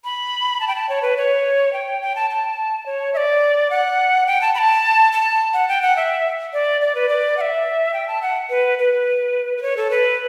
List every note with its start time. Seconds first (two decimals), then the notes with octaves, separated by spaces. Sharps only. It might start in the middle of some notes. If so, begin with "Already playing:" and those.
0.04 B5
0.60 A5
0.68 G5
0.76 A5
0.89 C#5
1.02 B4
1.17 C#5
1.73 G5
2.02 G5
2.16 A5
2.30 A5
2.86 C#5
3.14 E5
3.17 D5
3.70 F#5
4.27 G5
4.41 A5
4.55 B5
4.58 A5
5.12 A5
5.53 F#5
5.69 G5
5.82 F#5
5.96 E5
6.53 D5
6.81 D5
6.95 B4
7.09 D5
7.37 F#5
7.41 E5
7.94 G5
8.08 A5
8.22 F#5
8.50 B4
8.78 B4
9.57 B4
9.62 C#5
9.77 A4
9.91 B4